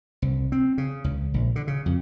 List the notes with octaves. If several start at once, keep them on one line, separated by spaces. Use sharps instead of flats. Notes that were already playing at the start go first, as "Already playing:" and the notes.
C2
C4
C#3
C#2
A#1
D3
C#3
F2